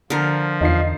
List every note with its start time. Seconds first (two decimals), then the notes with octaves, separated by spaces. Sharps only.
0.10 D3 F3 A#4
0.61 E2 D#4 F4 C7